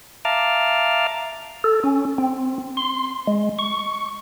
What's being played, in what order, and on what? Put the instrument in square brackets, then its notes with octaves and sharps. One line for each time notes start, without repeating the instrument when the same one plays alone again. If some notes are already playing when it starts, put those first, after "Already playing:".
[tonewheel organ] E5 F5 A5 A#5 D6 F6
A4
C#4
C4
C6
G#3
C#6